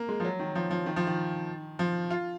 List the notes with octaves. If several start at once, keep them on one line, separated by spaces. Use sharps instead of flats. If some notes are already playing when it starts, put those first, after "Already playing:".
Already playing: A#3
G#3
F3
F#3
D#3
F3
F3
D#3
F3
D#3
F3
F4